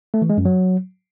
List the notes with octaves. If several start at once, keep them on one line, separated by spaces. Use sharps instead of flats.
A3
E3
G#3
F#2
F#3